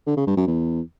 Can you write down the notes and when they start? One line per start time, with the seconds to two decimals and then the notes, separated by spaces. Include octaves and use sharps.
0.07 D3
0.17 C#3
0.27 G2
0.37 F#2
0.47 E2